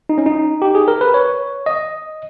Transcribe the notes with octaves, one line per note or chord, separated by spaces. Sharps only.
D#4
C#4
D#4
G4
G#4
A#4
B4
C#5
D#5